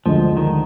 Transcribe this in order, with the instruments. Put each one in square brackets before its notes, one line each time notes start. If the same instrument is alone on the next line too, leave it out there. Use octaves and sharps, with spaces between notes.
[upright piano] D2 D3 G#3 [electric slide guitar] F3
[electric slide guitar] D#3